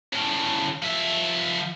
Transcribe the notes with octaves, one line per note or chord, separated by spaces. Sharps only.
A2 C#3
F3 E5